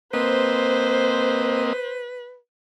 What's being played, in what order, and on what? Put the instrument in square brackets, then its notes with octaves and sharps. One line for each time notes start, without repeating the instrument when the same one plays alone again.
[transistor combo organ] A#3 C4 D#5 [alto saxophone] B4 [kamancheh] C5